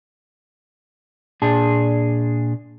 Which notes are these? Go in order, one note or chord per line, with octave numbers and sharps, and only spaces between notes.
A#2 D4 G#4 A5